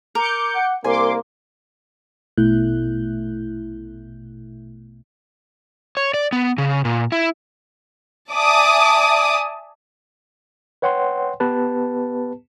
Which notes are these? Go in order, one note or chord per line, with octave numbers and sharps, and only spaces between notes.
A#4 D6 G6 C#7
F#5
C2 A#3 G#5 C6 D6
A#1 B2 A3 E4 F#6 G6
C#5
D5
B3
C#3
A#2
E4
D5 E5 G#5 A5 D6 D#6
B4 C#5 F#5 G5 C6
B3 G4 B4 A5